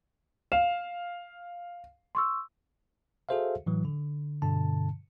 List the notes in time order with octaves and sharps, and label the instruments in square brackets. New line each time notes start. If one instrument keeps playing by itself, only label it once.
[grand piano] F5 [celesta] E7
[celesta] C6 C#6 E6
[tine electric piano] F#4 G#4 A4 C5 E5 F5
A2 E3 F#3
D3
G2 B2 D3 A5